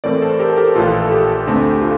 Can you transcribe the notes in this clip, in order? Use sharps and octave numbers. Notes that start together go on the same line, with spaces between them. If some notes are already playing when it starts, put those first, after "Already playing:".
A2 E3 A3 C4 A#4 D5
A4 C5
G4 A#4
A4
G4 A#4
A#1 A2 E3 F4 A4
A4
G4
D2 D3 A3 C4
G4
F4 A4